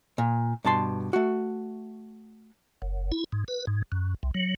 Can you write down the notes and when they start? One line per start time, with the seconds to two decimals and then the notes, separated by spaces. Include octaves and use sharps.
0.18 A#2
0.65 G2 B2 A5 C6
1.13 A3 F#4
2.82 F#1
3.12 E4
3.32 G#2
3.48 B4
3.67 G#2
3.92 F#2
4.23 C2
4.34 F#3